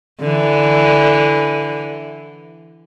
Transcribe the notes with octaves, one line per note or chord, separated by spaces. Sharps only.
D3 E3